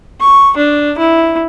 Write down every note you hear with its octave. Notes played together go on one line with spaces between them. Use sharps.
C#6
D4
E4